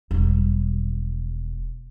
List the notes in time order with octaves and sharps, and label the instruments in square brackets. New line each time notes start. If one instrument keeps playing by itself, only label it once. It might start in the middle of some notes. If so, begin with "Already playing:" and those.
[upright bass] E1 G3